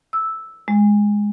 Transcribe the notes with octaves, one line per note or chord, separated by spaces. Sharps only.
E6
G#3